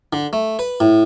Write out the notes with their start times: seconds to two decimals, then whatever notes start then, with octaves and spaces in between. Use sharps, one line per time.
0.13 D3
0.33 A3
0.59 B4
0.80 A2